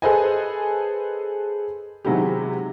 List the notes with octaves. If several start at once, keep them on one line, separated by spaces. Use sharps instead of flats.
G#4 A4 B4 C5 D#5 G#5
C3 D#3 F#3 G#3 E4 G4